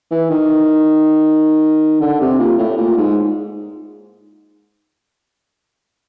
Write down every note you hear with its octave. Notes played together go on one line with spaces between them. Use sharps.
E3
D#3
D3
C3
A#2
A2
A#2
G#2